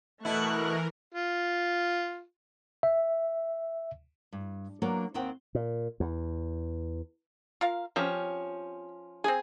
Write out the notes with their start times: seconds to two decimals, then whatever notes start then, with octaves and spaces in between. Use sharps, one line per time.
0.25 B2 E3 A3 E4 A#4 C#6 F#6
1.14 F4
2.83 E5
4.33 G2
4.82 F#3 A#3 B3 D4 F#4
5.14 D#2 D#3 C4 F#5 G5
5.55 A#2
6.00 E2
7.61 F4 A#4 F5
7.96 F3 C4 C#4 G4
9.24 C4 G#4 G#5